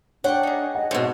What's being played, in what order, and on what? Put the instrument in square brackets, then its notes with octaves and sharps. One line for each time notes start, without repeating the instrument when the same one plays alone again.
[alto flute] D4 [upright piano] C#5 [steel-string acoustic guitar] F#5 [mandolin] G5 C6 C#6
[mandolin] D#4 G#4
[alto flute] D#5 [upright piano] F#5
[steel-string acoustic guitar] G#2 B2 [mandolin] A3 C4 C#5